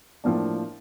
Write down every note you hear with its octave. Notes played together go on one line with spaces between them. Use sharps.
A2 F3 A#3 D4